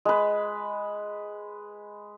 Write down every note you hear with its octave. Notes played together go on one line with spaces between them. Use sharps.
G#3 B4